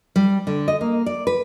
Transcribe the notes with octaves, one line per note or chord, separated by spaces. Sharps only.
G3
D3
D#5
A#3
D5
B4